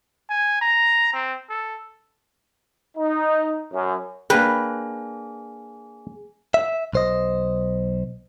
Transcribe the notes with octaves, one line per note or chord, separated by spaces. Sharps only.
G#5
A#5
C4
A4
D#4
F#2
A#3 D4 G#4 B4 G5
E5
B1 C5 D#5